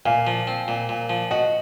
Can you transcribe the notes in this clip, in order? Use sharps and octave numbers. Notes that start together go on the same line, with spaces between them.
A#2 F5 G#5
F3
C4
A#2
A#2
F3
F#4 D#5 F#5